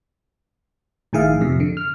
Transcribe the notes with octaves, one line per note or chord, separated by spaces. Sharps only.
A#1 A2 D#3 G#4 E5 F5
F2 C3
D3
F6